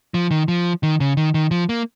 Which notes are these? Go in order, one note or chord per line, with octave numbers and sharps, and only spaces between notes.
F3
D#3
F3
D#3
C#3
D#3
D#3
F3
A#3